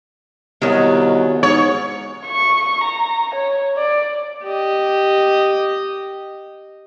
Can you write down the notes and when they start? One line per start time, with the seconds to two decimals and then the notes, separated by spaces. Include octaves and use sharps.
0.62 C2 D#3 F#3 B3 G4 D#5
1.43 G#2 C#5
2.26 C#6
2.83 A#5
3.34 C#5
3.77 D5
4.44 G4 D#5